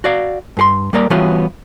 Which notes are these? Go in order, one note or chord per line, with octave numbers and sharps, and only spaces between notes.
F#4 D5 F5
G2 G#4 C6
G3 A#3 A#4 D5
E3 G3 B3 C#4 F4 F#4